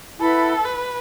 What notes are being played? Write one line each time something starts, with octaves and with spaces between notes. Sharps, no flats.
E4 A4 B4 F#5 B5
B4